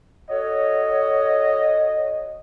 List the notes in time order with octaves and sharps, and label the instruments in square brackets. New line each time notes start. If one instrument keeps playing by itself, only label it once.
[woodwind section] F#4 A4 C#5 [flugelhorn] D#5